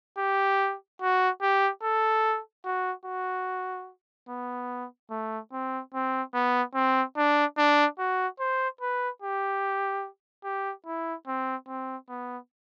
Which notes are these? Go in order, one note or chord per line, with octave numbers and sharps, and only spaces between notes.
G4
F#4
G4
A4
F#4
F#4
B3
A3
C4
C4
B3
C4
D4
D4
F#4
C5
B4
G4
G4
E4
C4
C4
B3